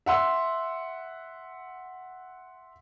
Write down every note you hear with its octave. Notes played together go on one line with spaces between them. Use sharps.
E5 F#5 C6 E6